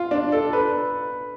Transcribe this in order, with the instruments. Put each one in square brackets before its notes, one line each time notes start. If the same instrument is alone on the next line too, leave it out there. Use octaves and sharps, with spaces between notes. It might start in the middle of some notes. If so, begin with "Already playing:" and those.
Already playing: [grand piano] F4
D4
A4
B4